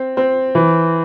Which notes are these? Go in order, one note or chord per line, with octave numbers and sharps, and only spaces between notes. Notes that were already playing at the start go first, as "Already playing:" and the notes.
Already playing: C4
C4
E3